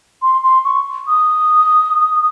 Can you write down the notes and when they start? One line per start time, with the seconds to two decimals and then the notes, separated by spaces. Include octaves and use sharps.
0.22 C6
0.43 C6
0.65 C#6
1.07 D#6